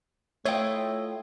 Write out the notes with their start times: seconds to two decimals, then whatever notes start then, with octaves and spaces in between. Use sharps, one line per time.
0.46 A3 E4 F4 C#5 D#5 G5